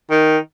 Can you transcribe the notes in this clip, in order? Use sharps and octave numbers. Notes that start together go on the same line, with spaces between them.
D#3